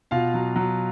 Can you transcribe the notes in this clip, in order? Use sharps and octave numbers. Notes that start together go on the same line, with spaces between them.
B2 F4 F5
F#3
F#3